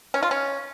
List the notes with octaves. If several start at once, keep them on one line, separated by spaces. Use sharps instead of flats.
C#4
F4
C#4